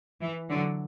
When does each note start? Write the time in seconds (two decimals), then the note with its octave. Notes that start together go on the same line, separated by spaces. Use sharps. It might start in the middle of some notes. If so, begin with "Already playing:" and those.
0.21 E3
0.50 D3 F#3